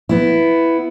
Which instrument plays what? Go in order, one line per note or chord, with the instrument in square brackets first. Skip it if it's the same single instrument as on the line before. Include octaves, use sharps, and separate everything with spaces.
[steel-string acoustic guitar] B3 E4